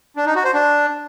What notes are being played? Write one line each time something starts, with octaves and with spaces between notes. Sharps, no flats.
D4
D#4
F#4
C5
D4